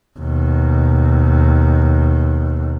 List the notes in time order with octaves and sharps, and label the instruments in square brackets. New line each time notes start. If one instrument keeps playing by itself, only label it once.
[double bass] D#2 B2